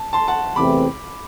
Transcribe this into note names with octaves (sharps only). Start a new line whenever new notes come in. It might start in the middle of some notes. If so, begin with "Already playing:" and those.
Already playing: A5
A5 C6
F#5 A5
E2 C3 E3 A3 C4 B5 D6